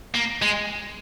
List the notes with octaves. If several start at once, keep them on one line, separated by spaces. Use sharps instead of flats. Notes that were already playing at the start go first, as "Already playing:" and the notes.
A#3
G#3